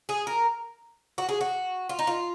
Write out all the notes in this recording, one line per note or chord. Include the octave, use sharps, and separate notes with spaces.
G#4
A#4
F#4
G#4
F#4
F4
D#4
F4